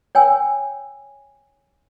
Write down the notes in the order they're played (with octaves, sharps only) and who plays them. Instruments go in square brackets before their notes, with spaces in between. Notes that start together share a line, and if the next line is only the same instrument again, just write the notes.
[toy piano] C#5 G5 G#5 E6